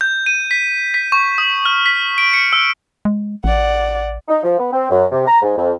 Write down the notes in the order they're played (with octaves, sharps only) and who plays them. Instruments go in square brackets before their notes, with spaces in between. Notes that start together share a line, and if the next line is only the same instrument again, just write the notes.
[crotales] G6
D#7
B6
B6
C#6
D#6
F6
B6
D7
C#7
E6
[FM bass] G#3
[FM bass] A1 [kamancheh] D5 F#5
[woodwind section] D#4
F3
B3
C4
F#2
C3
A#5
G#2
F2